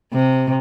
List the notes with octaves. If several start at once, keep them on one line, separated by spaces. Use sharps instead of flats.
C3